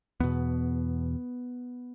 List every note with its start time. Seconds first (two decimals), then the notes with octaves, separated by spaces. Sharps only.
0.20 E2 B2 B3